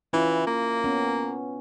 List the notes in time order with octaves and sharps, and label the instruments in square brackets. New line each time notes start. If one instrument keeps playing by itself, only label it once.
[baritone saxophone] E3 [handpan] C#4 E4 F4
[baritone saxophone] A#3
[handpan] B3 C#4